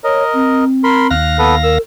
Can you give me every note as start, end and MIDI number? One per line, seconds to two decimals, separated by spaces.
0.04 0.64 70
0.04 0.24 73
0.04 0.64 75
0.34 1.13 60
0.84 1.07 70
0.84 1.07 83
0.84 1.07 84
1.11 1.78 39
1.11 1.78 77
1.11 1.37 89
1.11 1.37 90
1.11 1.78 94
1.39 1.55 59
1.39 1.55 69
1.39 1.55 71
1.63 1.80 70
1.63 1.76 88